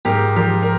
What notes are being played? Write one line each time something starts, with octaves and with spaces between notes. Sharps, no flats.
G#2 G4 A#4
F3 G4 A#4
A#4